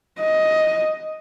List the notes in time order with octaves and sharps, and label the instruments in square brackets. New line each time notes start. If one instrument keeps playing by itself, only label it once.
[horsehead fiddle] D#5